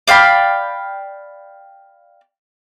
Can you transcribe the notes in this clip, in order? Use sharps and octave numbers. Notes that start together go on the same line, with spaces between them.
D5 F5 G5 B5